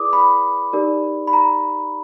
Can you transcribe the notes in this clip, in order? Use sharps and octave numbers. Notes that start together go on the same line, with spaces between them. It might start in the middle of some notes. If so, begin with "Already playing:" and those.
Already playing: E4 G#4 B4 D5 D6 D#6
B5
D#4 G4 A#4 D5
B5
A#5